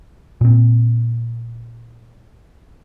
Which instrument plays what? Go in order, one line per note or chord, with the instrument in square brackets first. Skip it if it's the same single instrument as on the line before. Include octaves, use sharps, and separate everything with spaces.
[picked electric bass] A#2 C4